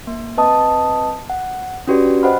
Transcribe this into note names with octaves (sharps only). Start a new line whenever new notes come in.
A#3
C4 B4 D#5 A5 D#6
F#5
C#4 D4 F#4 G4 B4 D5
C5 D#5 F#5 G5 B5 F6